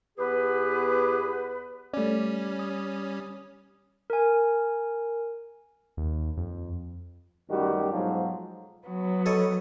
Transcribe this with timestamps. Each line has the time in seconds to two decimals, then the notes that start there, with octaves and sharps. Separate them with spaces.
0.17 E2 B3 G4 G#4 B4
1.93 G3 A3 C#4 D5
2.59 D#6
4.10 A#4 G#5
5.97 D#2
6.37 F2
7.50 A1 F#2 D#3 G3 F#4 G4
7.91 B1 G#2 F3 F#3
8.88 F#3 B3
9.26 A4 C#5 D#5